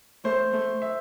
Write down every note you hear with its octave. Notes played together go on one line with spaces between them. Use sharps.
A3 C5
A3
E5